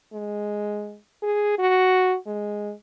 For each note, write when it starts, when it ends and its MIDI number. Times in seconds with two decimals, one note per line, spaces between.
0.13 0.96 56
1.22 1.58 68
1.59 2.16 66
2.27 2.73 56